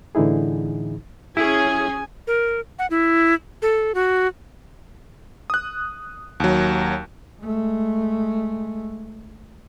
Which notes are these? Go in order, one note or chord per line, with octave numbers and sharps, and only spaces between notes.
A2 D3 E3 D#4 E4 G#4
C#4 E4 G#4 G#5
A#4
F#5
E4
A4
F#4
D#6 F#6
D#2 F#3
G#3 A3